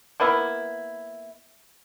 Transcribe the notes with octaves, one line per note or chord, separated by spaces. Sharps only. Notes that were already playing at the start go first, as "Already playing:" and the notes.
A#3 B3 E4